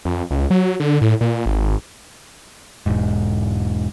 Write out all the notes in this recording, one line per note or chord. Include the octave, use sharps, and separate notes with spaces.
F2
C#2
F#3
D3
A2
A#2
G#1
E1 G#2